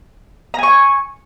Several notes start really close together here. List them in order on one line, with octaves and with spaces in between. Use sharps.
A#5 G#5 C#6